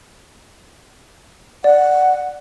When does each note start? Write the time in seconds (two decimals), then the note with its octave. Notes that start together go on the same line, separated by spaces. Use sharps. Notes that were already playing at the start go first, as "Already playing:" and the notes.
1.64 D5 F#5